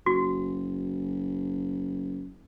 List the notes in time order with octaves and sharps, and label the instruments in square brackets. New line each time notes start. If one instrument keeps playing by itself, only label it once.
[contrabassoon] F#1 [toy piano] F#4